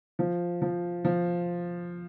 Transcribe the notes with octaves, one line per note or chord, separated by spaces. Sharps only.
F3
F3
F3